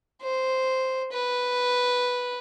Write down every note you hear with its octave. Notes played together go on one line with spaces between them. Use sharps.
C5
B4